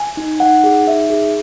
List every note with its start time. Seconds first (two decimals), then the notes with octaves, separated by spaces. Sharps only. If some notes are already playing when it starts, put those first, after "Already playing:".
Already playing: G#5
0.17 D#4
0.39 D#4 F#5
0.64 G#4
0.87 D#4 E5
1.10 G#4